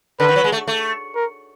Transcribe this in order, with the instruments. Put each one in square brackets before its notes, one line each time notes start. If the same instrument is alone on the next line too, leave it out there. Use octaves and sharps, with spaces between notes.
[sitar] D3 [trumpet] B4
[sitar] D#3
F#3
G#3
A3
A3
[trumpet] A#4